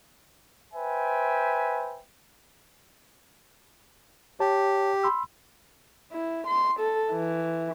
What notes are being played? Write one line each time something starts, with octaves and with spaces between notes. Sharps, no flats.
B4 C5 E5 G5 G#5
G4 C#5 A5
B5 C6 E6
E4
C6
A4
E3